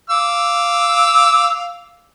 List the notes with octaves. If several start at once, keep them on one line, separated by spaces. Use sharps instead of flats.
F5 D6 E6